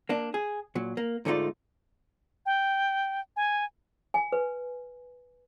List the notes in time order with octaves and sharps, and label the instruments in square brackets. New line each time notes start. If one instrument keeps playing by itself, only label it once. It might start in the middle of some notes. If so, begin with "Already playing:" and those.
[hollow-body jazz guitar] A#3 D4
G#4
A#2 F#3
A#3
G#2 D3 A3 D#4 F4 D5
[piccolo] G5
G#5
[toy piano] G#5
B4